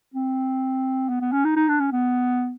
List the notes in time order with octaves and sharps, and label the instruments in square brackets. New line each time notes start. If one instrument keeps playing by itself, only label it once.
[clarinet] C4
B3
B3
C#4
D#4
D#4
D4
C#4
B3